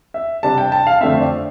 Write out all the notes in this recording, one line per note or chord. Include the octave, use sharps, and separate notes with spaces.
E5
C3 G3 D4 A5
G5
A5
F5
F2 D3 A3 C4 E5
D5